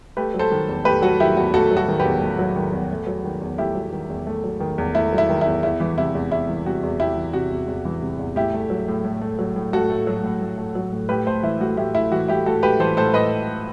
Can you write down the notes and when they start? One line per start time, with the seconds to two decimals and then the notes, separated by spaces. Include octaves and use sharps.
0.17 A3 G4 B4
0.34 F#3
0.39 A4 C5
0.52 D#3
0.69 E2
0.85 A3 G4 B4
1.02 F#3 F#4 A4
1.20 D#3 E4 G4
1.36 E2 F#4
1.54 A3 F#4 A4
1.71 F#3
1.77 F#4 A4
1.88 D#3
2.00 G4 B4
2.05 E2
2.21 A3
2.39 F#3
2.56 D#3
2.73 E2
2.91 A3
3.07 F#3
3.25 D#3
3.42 E2
3.58 A3 E4 G4
3.75 F#3
3.93 D#3
4.10 E2
4.27 A3
4.44 F#3
4.60 D#3
4.78 E2
4.95 A3 E4
5.13 F#3
5.18 E4
5.29 D#3
5.41 E2 E4
5.63 E2 E4
5.80 E3
5.98 C3 E4
6.15 E2
6.31 E2 E4
6.49 E3
6.66 C3 F#4
6.83 E2
7.00 E2 E4 G4
7.17 E3
7.33 C3 F#4
7.51 E2
7.68 E2
7.85 E3
8.02 C3
8.19 E2
8.36 A2 E4 G4
8.54 A3
8.70 F#3
8.88 A2
9.04 A2
9.21 A3
9.39 F#3
9.56 A2
9.73 A2 F#4 A4
9.90 A3
10.07 F#3
10.24 A2
10.41 A2
10.58 A3
10.75 F#3
10.92 A2
11.09 A2 G4 B4
11.26 A3 A4 C5
11.43 E3 E4
11.60 A2 F#4
11.77 A2 E4 G4
11.94 A3 E4
12.12 E3 F#4
12.28 A2 E4 G4
12.46 A2 F#4 A4
12.63 A3 G4 B4
12.80 E3 A4 C5
12.97 A2 A4 C5
13.14 A2 B4 D#5